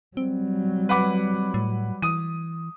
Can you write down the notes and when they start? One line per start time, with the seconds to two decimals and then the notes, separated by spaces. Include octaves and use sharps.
0.17 F#3 G3 C4
0.89 B4 F#5 D6
1.54 A2
2.02 E3 D#6 D#7